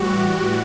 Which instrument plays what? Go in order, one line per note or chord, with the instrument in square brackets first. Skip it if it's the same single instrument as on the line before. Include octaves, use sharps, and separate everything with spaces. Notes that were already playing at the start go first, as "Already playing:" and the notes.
Already playing: [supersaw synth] A2 E3 G3 F#4 G4